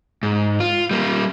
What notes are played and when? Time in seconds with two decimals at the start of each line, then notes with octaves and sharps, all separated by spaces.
0.23 G#2
0.60 F4
0.91 G3 A#3